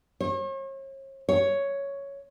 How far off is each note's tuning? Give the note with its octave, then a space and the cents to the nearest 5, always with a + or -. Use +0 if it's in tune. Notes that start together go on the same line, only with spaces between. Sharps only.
C#5 -40
C#5 +5